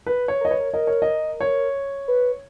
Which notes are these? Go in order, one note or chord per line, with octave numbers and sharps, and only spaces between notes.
B4
C#5
A#4 D#5
B4 C#5
A#4
A#4 D#5
C#5
D#5
C#5
B4